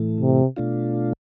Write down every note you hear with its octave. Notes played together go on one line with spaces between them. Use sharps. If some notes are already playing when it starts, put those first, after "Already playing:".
Already playing: A2 E3 A3
C3
B2 A3 D4 F4